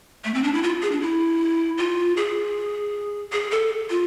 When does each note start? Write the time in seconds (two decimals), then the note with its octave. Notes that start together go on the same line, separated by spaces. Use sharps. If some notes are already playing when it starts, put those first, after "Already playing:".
0.25 A3
0.34 C4
0.44 D4
0.54 E4
0.63 F4
0.82 G#4
0.92 D4
1.01 E4
1.78 F4
2.17 G#4
3.32 G#4
3.51 A4
3.90 F4